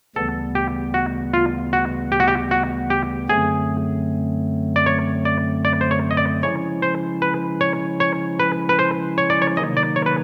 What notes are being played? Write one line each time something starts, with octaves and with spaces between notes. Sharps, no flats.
D2 C#3 E3 G3 B3 A4
G4
F#4
F4
F#4
G4
F#4
G4
F#4
G4
F#2 D3 F#3 A3 C4 G#4
D5
C#5
D5
D5
C5
C#5
D#5
D5
C#3 F3 G#3 C#4 E4 C#5
C5
B4
C#5
C#5
B4
B4
C5
C#5
D5
C#5
C3 D#3 F#3 A#3 D#4 D#5
D5
C#5
B4